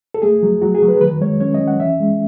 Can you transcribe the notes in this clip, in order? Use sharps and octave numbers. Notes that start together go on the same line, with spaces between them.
A4
A3 G#4
F#3
F#3 F#4
G#4
F#3
B4
D#3 B4
G#3 C#5
C#4 C#5
D#5
C#4
F#5
E3 E5
G#3